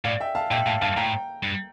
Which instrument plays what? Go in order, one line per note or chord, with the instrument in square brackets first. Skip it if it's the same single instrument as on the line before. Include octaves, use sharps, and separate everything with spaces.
[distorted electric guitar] A2 [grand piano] D5 F5
[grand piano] E5 G5
F5 A5
[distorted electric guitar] A#2 [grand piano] E5 G5
[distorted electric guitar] A2 [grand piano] F5 A5
[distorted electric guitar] G2 [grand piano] F5 A5
[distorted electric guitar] A2 [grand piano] G5 A#5
[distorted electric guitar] G2